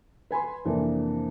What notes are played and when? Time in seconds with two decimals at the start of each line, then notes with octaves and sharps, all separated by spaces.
0.31 B4 G#5 B5 C6
0.65 F2 C3 E3 A#3 D4